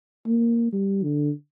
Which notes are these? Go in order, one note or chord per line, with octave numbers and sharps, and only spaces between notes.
A#3
G3
D3